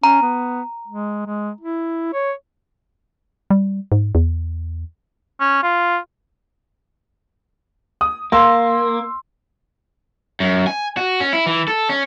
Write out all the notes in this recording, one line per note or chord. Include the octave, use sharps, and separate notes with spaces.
C#4 A#5
B3
G#3
G#3
E4
C#5
G3
G#2
E2
C#4
F4
D#6
A#3 C6 E6
F#2
G#5
F#4
C#4
E4
E3
A4
C#4